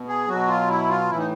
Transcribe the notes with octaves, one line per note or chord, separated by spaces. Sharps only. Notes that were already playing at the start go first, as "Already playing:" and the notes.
Already playing: B2
G#4
B2 F#3 F#4
F4
E4
F4
A2 E3 E4
D#4